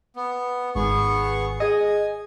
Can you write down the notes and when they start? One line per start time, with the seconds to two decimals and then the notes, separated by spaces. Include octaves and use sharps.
0.16 B3
0.75 G#1 B3 G#4 C#6
1.60 G#4 D#5 G#5